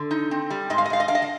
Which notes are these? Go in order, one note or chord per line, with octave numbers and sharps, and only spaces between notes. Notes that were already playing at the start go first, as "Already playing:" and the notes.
Already playing: D3
D#4
C4
G3
G#2 D#5
F5
D#5
G#2 F5
D#5
D4 F5
D#5
F5